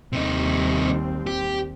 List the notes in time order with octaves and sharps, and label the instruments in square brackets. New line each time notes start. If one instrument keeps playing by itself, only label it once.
[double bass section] D#2 G3 C4 [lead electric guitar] C3 D#4
[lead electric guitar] G4